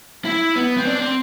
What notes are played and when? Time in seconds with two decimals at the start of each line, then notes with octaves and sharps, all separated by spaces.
0.25 E4
0.56 B3
0.78 C4
0.85 D4
1.00 C4